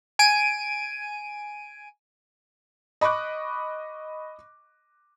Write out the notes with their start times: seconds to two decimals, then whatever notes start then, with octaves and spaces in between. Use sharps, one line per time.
0.19 G#5 D7 D#7
3.01 D#5 B5 C#6 D6 F#6